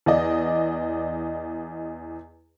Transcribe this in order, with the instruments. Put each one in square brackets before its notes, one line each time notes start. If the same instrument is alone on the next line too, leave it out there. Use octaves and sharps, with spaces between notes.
[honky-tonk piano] E2 D5 D#5